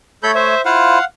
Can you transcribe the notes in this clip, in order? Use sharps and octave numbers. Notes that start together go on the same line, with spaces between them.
A3 A4 C#5 B5 G6
C5 E5
E4 F4 C5 F5 F#5